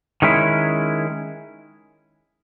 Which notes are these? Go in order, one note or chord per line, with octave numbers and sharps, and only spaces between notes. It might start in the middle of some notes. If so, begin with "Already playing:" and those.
D#3 G#3 C#4 E4